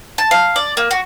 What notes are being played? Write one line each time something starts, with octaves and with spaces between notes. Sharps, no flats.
A5
F5
D5
A#3
F#4